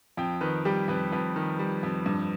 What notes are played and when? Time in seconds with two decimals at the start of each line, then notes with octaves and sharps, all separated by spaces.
0.17 F2 G5
0.41 D#3 B4
0.65 G3 G4
0.88 F2 B4
1.12 F2 B4
1.36 D#3
1.59 G3
1.83 F2
2.06 G2